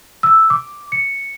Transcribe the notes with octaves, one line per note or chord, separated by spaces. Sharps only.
E6
D6
C#7